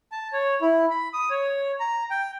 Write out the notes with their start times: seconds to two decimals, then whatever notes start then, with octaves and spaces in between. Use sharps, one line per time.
0.12 A5
0.33 C#5
0.62 E4
0.90 B5
1.13 D#6
1.30 C#5
1.80 A#5
2.11 G5